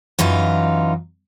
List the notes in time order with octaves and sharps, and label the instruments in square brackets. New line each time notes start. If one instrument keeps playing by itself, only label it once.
[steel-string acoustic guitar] F#2 E3 D#4 F4